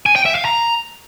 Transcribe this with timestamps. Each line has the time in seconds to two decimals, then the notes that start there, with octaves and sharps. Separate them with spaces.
0.06 G#5
0.16 G5
0.25 E5
0.35 F5
0.45 A#5